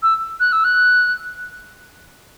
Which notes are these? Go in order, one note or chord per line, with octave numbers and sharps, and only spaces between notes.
E6
F#6
E6
F#6